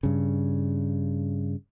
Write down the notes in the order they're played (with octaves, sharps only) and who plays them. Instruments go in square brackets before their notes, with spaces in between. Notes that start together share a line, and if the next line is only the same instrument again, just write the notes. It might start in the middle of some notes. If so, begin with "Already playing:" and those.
[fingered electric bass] G2 C#3